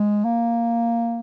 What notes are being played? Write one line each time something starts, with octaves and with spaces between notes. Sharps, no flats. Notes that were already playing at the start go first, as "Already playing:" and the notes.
Already playing: G#3
A#3